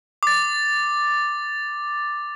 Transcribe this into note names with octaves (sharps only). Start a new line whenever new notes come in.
D6 A6